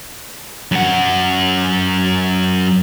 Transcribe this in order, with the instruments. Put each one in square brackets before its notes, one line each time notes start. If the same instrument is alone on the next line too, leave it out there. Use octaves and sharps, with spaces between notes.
[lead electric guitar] F#2 F#5